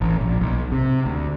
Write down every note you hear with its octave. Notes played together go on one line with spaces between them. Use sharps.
A1
A#1
B1
C3
D2